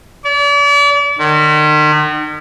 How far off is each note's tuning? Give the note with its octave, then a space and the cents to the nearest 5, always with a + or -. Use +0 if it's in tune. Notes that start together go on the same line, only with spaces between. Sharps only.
D5 -40
D#3 -40